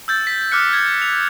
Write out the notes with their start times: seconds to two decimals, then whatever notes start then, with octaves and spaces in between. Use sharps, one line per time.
0.08 E6 G6 A6
0.27 B6
0.52 D6 F6 F#6 C#7
0.73 G#6
1.02 F7